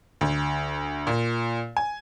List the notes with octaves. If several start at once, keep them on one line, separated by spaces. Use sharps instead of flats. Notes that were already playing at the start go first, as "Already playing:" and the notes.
D2
A#2
G#5